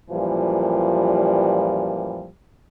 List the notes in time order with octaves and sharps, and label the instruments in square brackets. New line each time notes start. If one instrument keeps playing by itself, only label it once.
[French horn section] F#2 A#2 E3 F3 G3